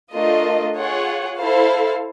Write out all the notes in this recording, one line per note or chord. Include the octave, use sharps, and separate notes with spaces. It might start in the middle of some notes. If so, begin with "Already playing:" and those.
A3 D4 F4 A#4 D#5
F4 G#4 C#5 F#5
E4 A4 C5 F5